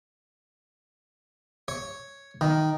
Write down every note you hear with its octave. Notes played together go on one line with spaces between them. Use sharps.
C#5
D#3